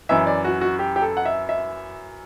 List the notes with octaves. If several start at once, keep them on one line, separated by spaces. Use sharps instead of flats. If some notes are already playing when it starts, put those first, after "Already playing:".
F#2 E3 E5
D5
F#4
F#4
G4
G4
A4
F#5
E5
E5